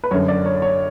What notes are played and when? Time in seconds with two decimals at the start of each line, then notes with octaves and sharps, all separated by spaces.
0.04 B4
0.11 F#2 D3 C#5
0.28 D5
0.46 C#5
0.62 C#5